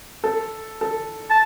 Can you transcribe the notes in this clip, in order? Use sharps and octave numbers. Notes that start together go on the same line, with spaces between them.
A4
A4
A5